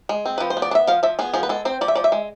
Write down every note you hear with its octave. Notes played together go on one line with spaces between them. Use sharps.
G#3
C4
F3 B4
C5
B3
D5
D4
E5
F3 F5
F3 E5
B3 G#4
F3 G#4
B4
G#3 A4
C4 C5
F3 D5
E5
F3 D5
E5
G#3